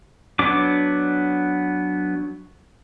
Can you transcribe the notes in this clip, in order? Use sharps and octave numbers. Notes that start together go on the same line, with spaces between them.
F#3 B3 D4 D6